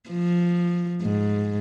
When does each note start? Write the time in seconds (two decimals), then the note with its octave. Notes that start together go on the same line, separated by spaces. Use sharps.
0.10 F3
1.02 G#2